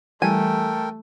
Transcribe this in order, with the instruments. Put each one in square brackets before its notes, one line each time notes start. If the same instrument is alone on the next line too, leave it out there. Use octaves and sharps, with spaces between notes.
[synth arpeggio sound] E3 G3 [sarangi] A3 [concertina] A4 A#4 G5 [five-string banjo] G#5